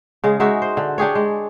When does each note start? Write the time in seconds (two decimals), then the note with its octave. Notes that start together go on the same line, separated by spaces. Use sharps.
0.24 C#3 G#3
0.40 G#3 D#4 F#4 E5
0.62 C5
0.77 D3
0.98 D4 G4 G#4 C#5
1.15 G#3